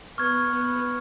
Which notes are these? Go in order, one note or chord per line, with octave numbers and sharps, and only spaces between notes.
B3 C#6 F6 G#6
B3